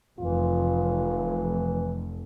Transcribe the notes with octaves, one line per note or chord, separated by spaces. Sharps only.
F1 E3 F4